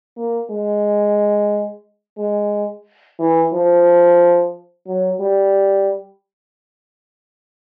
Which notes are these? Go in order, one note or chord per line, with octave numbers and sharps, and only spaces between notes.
A#3
G#3
G#3
E3
F3
F#3
G3